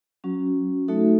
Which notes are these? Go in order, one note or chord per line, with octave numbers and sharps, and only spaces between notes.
F#3 C#4 F#4
A3 D#4 F#4 A4 E5